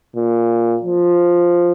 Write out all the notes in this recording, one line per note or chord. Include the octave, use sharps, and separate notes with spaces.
A#2
F3